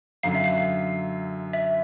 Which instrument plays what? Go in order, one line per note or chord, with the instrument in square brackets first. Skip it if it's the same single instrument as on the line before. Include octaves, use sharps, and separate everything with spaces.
[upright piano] F#2 D3 F#3 [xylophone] F5
[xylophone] E5
F5
E5